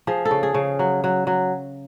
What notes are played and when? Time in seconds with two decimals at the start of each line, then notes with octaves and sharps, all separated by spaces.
0.07 F3 G#4
0.25 A4
0.31 C#3
0.43 G#4
0.54 C#3
0.79 F#3
1.04 F#3
1.27 F#3